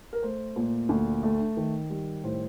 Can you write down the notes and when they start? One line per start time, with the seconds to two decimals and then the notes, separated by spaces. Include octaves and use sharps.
0.13 A#4
0.22 A3 C5
0.56 A#2
0.89 D2
1.23 A3
1.57 D#3
1.90 G3
2.24 A2 C5